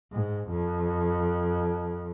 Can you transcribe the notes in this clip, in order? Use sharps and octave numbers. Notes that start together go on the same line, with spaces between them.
G#2
F2